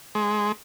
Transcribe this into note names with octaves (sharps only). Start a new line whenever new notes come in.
G#3